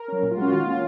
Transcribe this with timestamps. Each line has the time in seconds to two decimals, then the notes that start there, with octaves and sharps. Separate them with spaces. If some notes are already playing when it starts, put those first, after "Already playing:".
Already playing: A#4
0.08 F#3 C#4
0.22 A#2
0.31 F4
0.37 G#3 C#4 F#4
0.52 D#3 F4
0.67 A#3 C#4